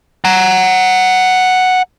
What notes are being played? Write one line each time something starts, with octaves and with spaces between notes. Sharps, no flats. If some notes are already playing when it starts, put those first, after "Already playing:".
F#5 A#5